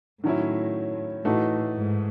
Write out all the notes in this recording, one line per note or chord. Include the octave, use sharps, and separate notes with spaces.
A2 D#3 F#3 C#4 E4
A2 E3 A3 D#4 F#4
G#2